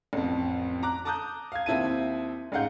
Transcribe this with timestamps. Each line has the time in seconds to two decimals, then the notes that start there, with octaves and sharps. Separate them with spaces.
0.13 A1 F2
0.83 A#5 D6 F#6
1.05 A5 A#5 D6 D#6 F#6 G6
1.52 F5 G#6
1.66 D#2 C4 E4 E5 A5 D#7
2.52 A1 G#2 F5 F#5 G6